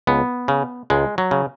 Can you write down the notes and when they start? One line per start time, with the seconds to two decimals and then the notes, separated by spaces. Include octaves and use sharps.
0.07 C#2 B3
0.48 C#3
0.90 C#2 G#3
1.18 F#3
1.31 C#3